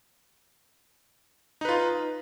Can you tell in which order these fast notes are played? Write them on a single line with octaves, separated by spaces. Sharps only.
D#4 B4 F4